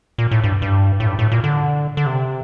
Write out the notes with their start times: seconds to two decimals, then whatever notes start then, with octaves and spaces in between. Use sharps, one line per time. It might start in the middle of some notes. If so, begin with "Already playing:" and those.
0.18 A#2
0.31 A2
0.44 G2
0.62 G2
1.00 A2
1.07 G2
1.19 A2
1.32 A#2
1.44 D3
1.97 D3
2.06 C3